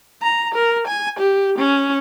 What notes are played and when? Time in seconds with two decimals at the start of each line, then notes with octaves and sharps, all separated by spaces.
0.22 A#5
0.55 A#4
0.87 G#5
1.19 G4
1.58 C#4